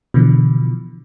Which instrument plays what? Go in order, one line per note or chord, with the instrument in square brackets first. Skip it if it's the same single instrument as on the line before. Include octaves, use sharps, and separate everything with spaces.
[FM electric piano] B2 D3 E3 F3